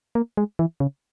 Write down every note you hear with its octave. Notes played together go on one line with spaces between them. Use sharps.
A#3
G#3
E3
C#3